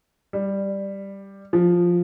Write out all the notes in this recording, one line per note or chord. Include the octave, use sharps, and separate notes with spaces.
G3
F3